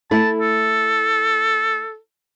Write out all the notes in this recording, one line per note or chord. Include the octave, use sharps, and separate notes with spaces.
A3 E4 A5
A4